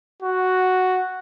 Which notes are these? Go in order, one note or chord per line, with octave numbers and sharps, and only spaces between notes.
F#4